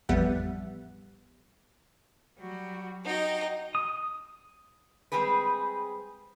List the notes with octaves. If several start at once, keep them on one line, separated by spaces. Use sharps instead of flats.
A1 F2 G3 B3 E5 F#5
F#3 G3 F#4
D#4 F#4 D#5 F#5 G5
D#6
G3 G#3 C4 G#4 B4